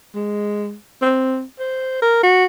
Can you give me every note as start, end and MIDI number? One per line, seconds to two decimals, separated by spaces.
0.15 0.75 56
1.02 1.43 60
1.60 1.98 72
2.02 2.20 70
2.23 2.45 66